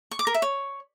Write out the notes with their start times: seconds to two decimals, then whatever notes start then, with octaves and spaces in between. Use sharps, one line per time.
0.11 C#6
0.19 D6
0.27 A#4
0.34 E5
0.42 C#5